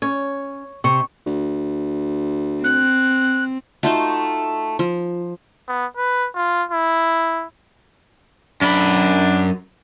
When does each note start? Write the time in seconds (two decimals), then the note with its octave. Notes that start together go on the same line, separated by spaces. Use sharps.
0.02 C#4 C#5
0.84 C3 C#6
1.26 D2
2.64 C4 F#6
3.83 A3 D#4 F4 F#4 A5
4.79 F3
5.68 B3
5.97 B4
6.35 F4
6.71 E4
8.62 F#2 D4 B5